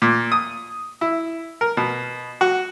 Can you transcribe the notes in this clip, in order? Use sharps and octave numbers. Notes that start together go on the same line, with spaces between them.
A#2
D#6
E4
A#4
B2
F#4